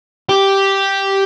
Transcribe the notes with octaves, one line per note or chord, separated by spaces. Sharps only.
G4